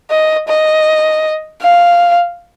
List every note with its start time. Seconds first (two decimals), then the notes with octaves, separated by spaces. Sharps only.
0.10 D#5
0.48 D#5
1.62 F5